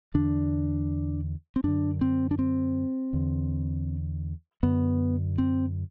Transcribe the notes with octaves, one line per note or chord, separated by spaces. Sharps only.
E2 D3 D4
C4
F#2 D3 D4
C4
D4
C4
E2 D3
F#2 D3 B3
C4